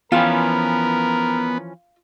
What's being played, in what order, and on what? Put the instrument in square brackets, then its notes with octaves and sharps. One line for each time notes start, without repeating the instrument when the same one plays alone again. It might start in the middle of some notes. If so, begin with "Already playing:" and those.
[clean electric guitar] E3 F3 C#4 [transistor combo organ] B3 [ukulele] F4 [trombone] A#4